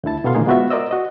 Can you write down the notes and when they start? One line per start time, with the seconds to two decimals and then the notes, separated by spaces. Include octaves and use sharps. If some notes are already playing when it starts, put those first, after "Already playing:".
0.04 D2 D3 E4 A5
0.24 G2 B2 B3 A4 F5 C6
0.35 A#2 D3 E3 A#3 D#4 G#4
0.46 G#3 B3 F4 F#4 C5 E5
0.70 A#4 C5 D5 D#5 E6
0.91 F#4 D#5